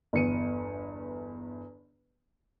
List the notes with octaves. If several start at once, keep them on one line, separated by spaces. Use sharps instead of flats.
G1 E2 C#7 D#7